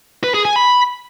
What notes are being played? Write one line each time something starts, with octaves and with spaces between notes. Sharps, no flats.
B4
G#4
G#5
B5